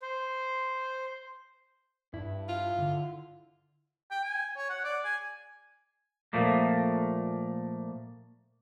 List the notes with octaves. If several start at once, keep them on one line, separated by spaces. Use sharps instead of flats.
C5
G2 E4
F4
D3
G5
G#5
C#5
F#5
D5
G#5
A#2 F3 A3 A#3